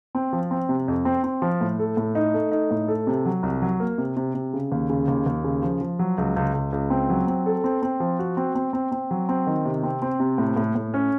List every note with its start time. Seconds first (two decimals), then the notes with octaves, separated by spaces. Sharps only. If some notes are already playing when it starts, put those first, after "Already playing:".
0.15 C4
0.33 F3
0.51 C4
0.69 C3
0.88 F2
1.05 C4
1.24 C4
1.42 F3
1.61 A2
1.79 A4
1.97 A2
2.15 D#4
2.34 A3
2.52 D#4
2.71 A2
2.88 A4
3.07 C3
3.26 F#3
3.43 C2
3.62 F#3
3.80 A#3
3.98 C3
4.17 C3
4.35 C3
4.54 C#3
4.72 D#2
4.90 C#3
5.08 D#2
5.26 D#2
5.44 C#3
5.63 F3
5.81 F3
5.99 F#3
6.18 C#2
6.36 C#2
6.54 C#2
6.73 C#2
6.90 C4
7.10 F#3
7.27 C4
7.46 A4
7.64 C4
7.82 C4
8.00 F3
8.19 F#4
8.37 C4
8.55 C4
8.73 C4
8.92 C4
9.11 F#3
9.29 C4
9.47 D#3
9.65 C3
9.83 C4
10.02 C4
10.20 C3
10.38 A2
10.56 A2
10.75 A2
10.94 C#4